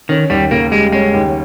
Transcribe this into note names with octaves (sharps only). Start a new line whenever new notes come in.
D#3 C#4
D#2 G3
C#3 A#3
G3 G#3
G#3 C#4
D#2